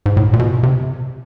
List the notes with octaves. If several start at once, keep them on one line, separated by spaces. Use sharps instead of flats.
G#2
A2
A#2
B2
C3